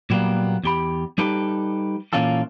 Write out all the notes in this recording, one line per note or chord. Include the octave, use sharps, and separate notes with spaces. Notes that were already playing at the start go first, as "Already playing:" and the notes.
A#2 F#3 G3 A#3 B3
E2 G4 B5
G3 D#4 G4 A4 B4
A#2 E3 A#3 C#4 F4 A4